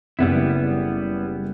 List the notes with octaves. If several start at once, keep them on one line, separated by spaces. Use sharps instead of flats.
F#1 G3 B3 E4